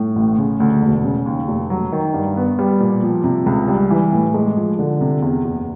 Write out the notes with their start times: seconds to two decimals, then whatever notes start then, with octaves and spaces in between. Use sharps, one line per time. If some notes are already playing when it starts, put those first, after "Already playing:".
Already playing: A2
0.16 A1
0.38 C#3
0.60 D2
0.82 E1
1.04 C#3
1.26 D#2
1.48 F1
1.70 F#3
1.92 D#3
2.14 G2
2.37 B3
2.59 G3
2.80 A#2
3.02 F3
3.24 C3
3.46 C#2
3.68 G3
3.91 E3
4.13 A2
4.34 G#3
4.57 F3
4.79 D3
5.01 C3
5.22 E2
5.45 F#1